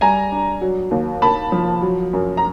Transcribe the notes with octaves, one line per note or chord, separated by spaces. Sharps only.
G3 G#5 A#5
D4
F#3
D#2
A#3 A5 B5
F3
F#3
F#2
A#5